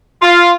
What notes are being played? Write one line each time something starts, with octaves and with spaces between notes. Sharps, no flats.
F4